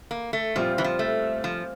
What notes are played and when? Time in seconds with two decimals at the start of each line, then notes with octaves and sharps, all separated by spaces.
0.11 A#3
0.33 A3
0.56 A#2 F3 G3 C4 F4
0.78 E3
0.84 F3
0.99 A3
1.44 F3